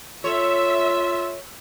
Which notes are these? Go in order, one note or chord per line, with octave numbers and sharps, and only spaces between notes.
F4 A4 C#5 E5